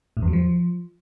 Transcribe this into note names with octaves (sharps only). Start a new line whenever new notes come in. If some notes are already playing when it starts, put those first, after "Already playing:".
A2
E2
F#3
F3